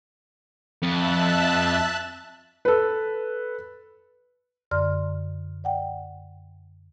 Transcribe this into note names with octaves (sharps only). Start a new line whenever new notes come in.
F2 E5 A5 F#6
A4 B4
F#2 D3 D5 C6 F6
D5 F#5 G5